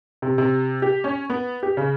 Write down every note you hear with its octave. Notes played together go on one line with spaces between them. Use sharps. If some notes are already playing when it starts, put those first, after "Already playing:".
C3
C3
G4
C#4
B3
G4
C#3